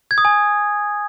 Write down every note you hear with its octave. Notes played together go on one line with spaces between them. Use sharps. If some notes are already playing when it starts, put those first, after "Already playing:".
G#6
D#6
G#5